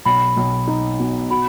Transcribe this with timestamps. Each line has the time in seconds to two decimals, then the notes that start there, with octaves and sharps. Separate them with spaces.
0.06 B1 B5
0.37 B1
0.67 D#4
0.99 B2
1.30 F#4 B5